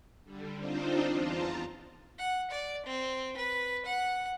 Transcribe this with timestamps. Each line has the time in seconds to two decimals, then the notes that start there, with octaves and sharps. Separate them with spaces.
0.24 D3 G3
0.57 C4 D4 D#4 F4 C5
1.12 E2 F4 A5 A#5
2.19 F#5
2.51 D5
2.86 C4
3.37 B4
3.86 F#5